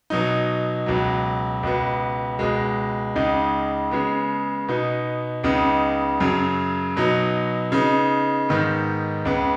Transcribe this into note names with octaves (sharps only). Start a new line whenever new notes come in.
B2 F#3 D#4
C#2 B2 F#3
C#2 B2 B3
C#2 B2 G#3
C#2 C#3 G#3 D#4
C#3 G#3 B3
B2 B3 D#4
C#2 C#3 B3 D#4
F#2 C#3 F#3
B2 F#3 B3 D#4
C#3 B3 D#4
G#2 D#3 B3
C#2 C#3 B3